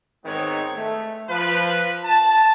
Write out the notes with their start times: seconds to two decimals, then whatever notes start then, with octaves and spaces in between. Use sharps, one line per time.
0.24 G#2 D#3 B3 C4 C#5
0.76 A3
1.29 F3 B4
2.03 A5